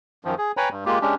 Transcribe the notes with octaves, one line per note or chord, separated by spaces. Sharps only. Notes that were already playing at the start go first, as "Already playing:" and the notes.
F#2 D#3 F3
G#4
B4 C#5 G5 G#5 A#5 B5
G2
G#3 A#3 F4 G4
G#3 C#4 D4 G4